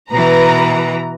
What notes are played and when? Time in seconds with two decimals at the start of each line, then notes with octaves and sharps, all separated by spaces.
0.11 B2 E3 B4 A#5